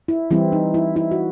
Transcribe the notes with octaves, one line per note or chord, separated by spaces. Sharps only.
E4
E3 G3 C4 E4
D#4
E4
E4
F#4